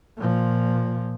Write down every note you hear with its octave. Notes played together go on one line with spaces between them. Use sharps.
A#2 F3